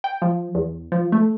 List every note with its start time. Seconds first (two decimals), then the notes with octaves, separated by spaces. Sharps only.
0.04 G5
0.22 F3
0.55 E2
0.92 F3
1.12 A3